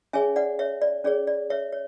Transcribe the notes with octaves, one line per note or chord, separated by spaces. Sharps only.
C#4 G#4 C#5 E5 G#5
D5 F#5
C#5 E5
D5
C#4 G#4 C#5 D5
D5
C#5 E5
C#5